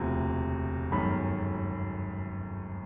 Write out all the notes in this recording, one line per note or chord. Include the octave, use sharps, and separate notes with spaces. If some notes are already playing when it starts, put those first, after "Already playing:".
Already playing: E1 D2 C3 F3
G1 F#2 D#3 G#3 B5